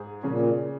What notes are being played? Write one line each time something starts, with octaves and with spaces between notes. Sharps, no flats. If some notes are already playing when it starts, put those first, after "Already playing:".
Already playing: G#2 G#4
A#2 C#3 F3 G#3 C#4